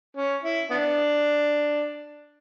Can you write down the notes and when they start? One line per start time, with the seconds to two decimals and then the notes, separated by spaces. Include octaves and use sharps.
0.17 C#4
0.43 E4
0.70 B3 D4